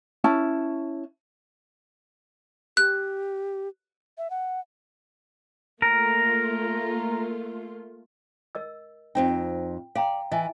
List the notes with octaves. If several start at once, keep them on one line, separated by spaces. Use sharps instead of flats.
C#4 E4 A5
G4 F#6
E5
F#5
A3 A#3 F4 A#4
A#4 D#5 E6
F2 C4 D#4 G5
D5 F5 G5 A#5
E3 D#5 G#5